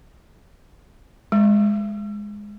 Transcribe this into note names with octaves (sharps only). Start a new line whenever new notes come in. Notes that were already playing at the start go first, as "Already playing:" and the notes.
G#3